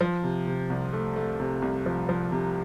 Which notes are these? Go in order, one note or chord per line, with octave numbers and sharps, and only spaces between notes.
F3
C3
C3
C2
A3
A3
C3
C2
F3
F3
C3